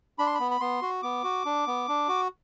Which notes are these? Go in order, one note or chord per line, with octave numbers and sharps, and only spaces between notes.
D4 B5
C6
B5
B3
B5
B3 C6
F#4
B3 D6
F#4
D4
B3
D4
F#4